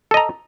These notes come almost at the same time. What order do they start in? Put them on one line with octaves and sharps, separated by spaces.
A4 D#5 A#5